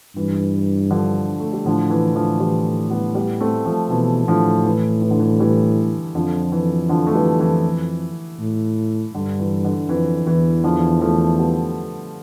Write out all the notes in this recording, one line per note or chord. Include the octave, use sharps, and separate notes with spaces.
G2 E3
D3 F3
A3
G3
A2 D3 F3
E3
D3 F3
E3 G3
G3 B3
G3 B3
A3 C4
F3 A3
B2 E3
A2 D3 F3
E3
E3
D3
E3
E3 G3
F2 D3 F3
E3
D3 F3
A3
E3 G3
E3
A2
G2 D3
E3
D3
F2 E3
E2 E3
D3 F3
F3 A3
G3 B3